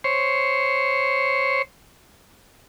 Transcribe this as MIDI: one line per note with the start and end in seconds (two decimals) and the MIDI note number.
0.04 1.62 72
0.04 1.62 73